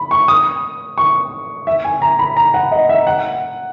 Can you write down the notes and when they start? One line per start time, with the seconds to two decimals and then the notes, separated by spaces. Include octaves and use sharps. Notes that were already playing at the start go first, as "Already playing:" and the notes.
Already playing: B5
0.11 C#6
0.28 D#6
0.98 C#6
1.67 E5
1.85 G#5
2.02 A#5
2.19 B5
2.37 A#5
2.54 F#5
2.72 D#5
2.89 E5
3.07 F#5